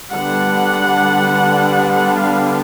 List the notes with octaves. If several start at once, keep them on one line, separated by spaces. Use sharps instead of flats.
D3 G3 B3 D4 F#5
F#5
F5